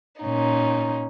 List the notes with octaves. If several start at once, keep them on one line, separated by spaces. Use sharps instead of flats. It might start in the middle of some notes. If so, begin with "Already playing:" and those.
A#2 C#4 D#4